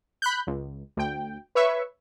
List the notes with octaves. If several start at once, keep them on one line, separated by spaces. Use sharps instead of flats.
B5 F#6 G6
C#2
D2 G5
B4 C#5 E5 C#6